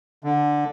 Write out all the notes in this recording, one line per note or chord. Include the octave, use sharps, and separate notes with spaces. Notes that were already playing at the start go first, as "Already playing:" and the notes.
D3